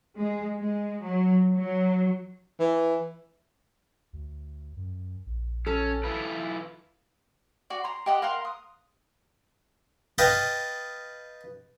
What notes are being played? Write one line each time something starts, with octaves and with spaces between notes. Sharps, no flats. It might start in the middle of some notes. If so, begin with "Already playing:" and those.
G#3
G#3
F#3
F#3
E3
D2
F#2
A#1
C#4 A4
E4 F4 B4
F#4 D5
A#5 C6
G4 D#5 F#5 D#6
A#4 F5 F#5 C6
D#6
B4 D#5 F5 G5 A5 B5